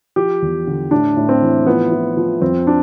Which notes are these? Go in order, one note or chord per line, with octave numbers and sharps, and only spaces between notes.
F3 G4
E2
D3
A2 D4
A2
C4
E3
F3 B3
F3
F3
F2 C4
D4